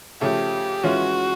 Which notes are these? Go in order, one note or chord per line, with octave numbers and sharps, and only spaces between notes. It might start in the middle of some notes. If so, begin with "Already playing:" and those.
C#3 F3 A3 G4
E3 G#3 C#4 F4 F#4